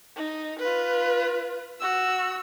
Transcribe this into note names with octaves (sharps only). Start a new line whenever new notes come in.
D#4
F4 B4
F#4 E6